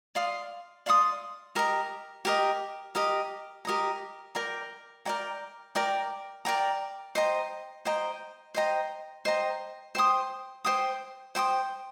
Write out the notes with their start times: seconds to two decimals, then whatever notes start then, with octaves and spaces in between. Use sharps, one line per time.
0.15 D5 F5 C6 D#6
0.86 D5 F5 C6 D#6
1.55 G4 A#4 D#5 A#5
2.25 G4 A#4 D#5 A#5
2.95 G4 A#4 D#5 A#5
3.65 G4 A#4 D#5 A#5
4.35 A#4 D5 G5 A#5
5.05 A#4 D5 G5 A#5
5.75 A#4 D5 G5 A#5
6.45 A#4 D5 G5 A#5
7.15 C5 D#5 G5 A#5
7.85 C5 D#5 G5 A#5
8.55 C5 D#5 G5 A#5
9.25 C5 D#5 G5 A#5
9.95 C5 G5 C6 D#6
10.65 C5 G5 C6 D#6
11.35 C5 G5 C6 D#6